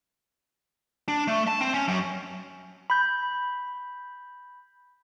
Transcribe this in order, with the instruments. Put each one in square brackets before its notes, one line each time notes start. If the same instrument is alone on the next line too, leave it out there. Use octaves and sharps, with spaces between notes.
[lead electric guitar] D4
A3
A5
C4
C#4
F#2
[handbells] B5 G6